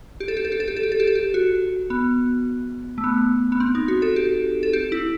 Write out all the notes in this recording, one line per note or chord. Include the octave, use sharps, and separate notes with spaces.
G4
A4
G4
A4
G4
A4
G4
A4
G4
A4
G4
A4
G4
F#4
B3
A3
B3
B3
C4
D#4
F#4
A4
G4
A4
G4
E4